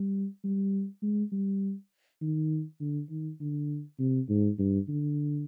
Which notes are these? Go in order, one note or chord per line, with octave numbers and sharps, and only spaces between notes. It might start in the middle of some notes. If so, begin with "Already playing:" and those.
Already playing: G3
G3
G#3
G3
D#3
D3
D#3
D3
C3
G#2
G2
D3